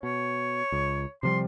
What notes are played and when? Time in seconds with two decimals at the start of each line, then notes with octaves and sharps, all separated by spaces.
0.03 B2 C#5
0.72 C#2
1.23 C3 F3 G3 C6